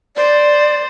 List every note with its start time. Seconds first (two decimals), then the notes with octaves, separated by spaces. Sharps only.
0.16 C5 D5